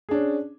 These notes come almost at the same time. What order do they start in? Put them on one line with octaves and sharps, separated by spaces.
G#4 D4 C#4